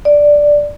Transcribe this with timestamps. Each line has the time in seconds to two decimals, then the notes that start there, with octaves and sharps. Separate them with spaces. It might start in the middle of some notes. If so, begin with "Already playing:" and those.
0.05 D5